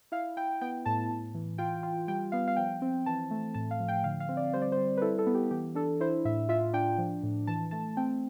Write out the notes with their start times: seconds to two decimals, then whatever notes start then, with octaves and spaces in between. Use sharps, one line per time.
0.12 E4 F5
0.37 E4 G5
0.61 B3 G5
0.85 A2 A5
1.10 A2
1.34 E3
1.58 F4 G5
1.83 F4
2.08 G3 G5
2.32 B3 F5
2.48 F5
2.56 F3 G5
2.82 C4
3.06 E3 A5
3.31 A3
3.54 A2 A5
3.71 F5
3.80 F3
3.88 G5
4.04 D3 F5
4.20 F5
4.29 C4
4.37 D5
4.53 G3 C5
4.62 D5
4.72 C5
4.78 G3
4.97 B4
5.02 E4 A4
5.19 A4
5.26 B3
5.34 G4
5.51 E3 G4
5.75 D4 A4
6.00 E4 C5
6.25 A2 E5
6.49 F4 E5
6.73 D4 G5
6.98 F3
7.23 A2
7.47 E3 A5
7.71 A3 A5
7.97 C4 G5